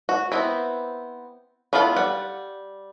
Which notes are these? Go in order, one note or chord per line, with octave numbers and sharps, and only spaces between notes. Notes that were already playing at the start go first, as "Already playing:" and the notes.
F#4
B3 C4 E4
B3 E4 F4 A4 F5
G3 F#5